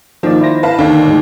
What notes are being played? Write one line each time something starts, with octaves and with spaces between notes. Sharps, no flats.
D#3 F3 A#3 D5
E4 C5 A#6
B4 F5 A5
D#2 D3 D#3 D4
A2 G#3